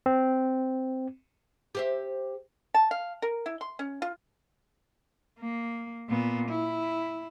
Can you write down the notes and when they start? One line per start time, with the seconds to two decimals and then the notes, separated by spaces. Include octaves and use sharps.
0.06 C4
1.75 G4 C5 E5
2.74 A5
2.91 F5
3.22 A#4
3.46 E4
3.61 C6
3.79 C#4
4.02 F4
5.39 A#3
6.09 A#2 B3
6.49 E4